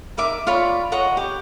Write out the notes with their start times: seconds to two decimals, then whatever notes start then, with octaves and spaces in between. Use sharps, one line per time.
0.17 D#4 A#4 E5 D6
0.47 F4 C#5 D5 B5
0.92 C#5 D#5 F#5 A#5
1.17 G4